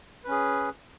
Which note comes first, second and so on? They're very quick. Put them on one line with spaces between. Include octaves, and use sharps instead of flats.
B4 C#4 G#4